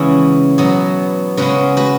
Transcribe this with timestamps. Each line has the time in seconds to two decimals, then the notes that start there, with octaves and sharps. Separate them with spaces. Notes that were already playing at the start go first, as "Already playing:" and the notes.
Already playing: C#3 E3 G#3 B3 C#4 E4 G#4 B4
0.58 B2 F#3 B3
1.37 C#3 G#3 C#4 F#4 B4
1.77 F#4 B4